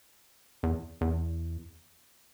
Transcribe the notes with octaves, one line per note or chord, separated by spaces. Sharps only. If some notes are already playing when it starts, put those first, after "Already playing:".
E2
E2